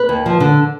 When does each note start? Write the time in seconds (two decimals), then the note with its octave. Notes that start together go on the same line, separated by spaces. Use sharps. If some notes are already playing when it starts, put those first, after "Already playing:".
Already playing: B4
0.09 D#2
0.26 F3
0.40 D3